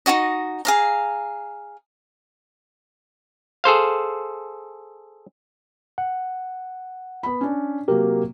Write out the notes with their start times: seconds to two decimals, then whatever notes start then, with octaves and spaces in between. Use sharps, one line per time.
0.06 D#4 F4 F#4 D#5
0.65 G#4 F5 A#5
3.64 G#4 A4 C5 F5
5.98 F#5
7.23 B3 B5
7.41 C#4 D4
7.88 C3 F#3 A#3 G4 A#4